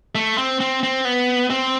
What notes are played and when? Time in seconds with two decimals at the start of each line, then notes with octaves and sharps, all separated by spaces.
0.15 A3
0.38 C4
0.60 C4
0.83 C4
1.05 B3
1.50 C4